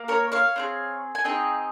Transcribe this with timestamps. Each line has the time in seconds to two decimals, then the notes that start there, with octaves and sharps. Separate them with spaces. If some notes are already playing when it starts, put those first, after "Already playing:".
Already playing: A#3
0.08 A#4 C#5
0.32 C#5 F5
0.56 C4 D#4 G#4
1.15 G#5
1.24 C4 D#4 G#4 D#5 G5